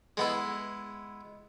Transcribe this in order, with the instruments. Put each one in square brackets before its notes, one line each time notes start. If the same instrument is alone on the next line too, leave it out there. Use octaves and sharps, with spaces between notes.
[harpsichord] G#3 B3 E4